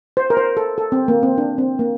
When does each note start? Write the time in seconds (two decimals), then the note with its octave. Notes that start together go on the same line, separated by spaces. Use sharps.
0.17 C5
0.30 A#4
0.37 C5
0.57 A4
0.78 A4
0.92 C4
1.08 A#3
1.23 C4
1.38 D4
1.58 C4
1.79 A#3